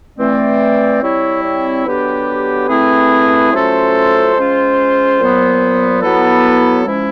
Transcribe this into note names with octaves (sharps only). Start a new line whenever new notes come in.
E3 A3 C4 D5
G3 C4 E4 C#5
C#5
D3 F#3 B3 D4 G4 B4
A3 C4 E4 G#4
F#3 A3 C#4 F4 A4 C5
G#3 C#4 F4
A#2 F#3 B3
F#3 B3 E4 A4 B4
F3 G#3 C#4 E4